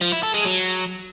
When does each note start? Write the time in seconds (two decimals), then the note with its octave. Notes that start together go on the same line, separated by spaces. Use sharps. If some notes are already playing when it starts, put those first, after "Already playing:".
0.01 F3
0.12 E4
0.23 A4
0.34 G#3
0.45 F#3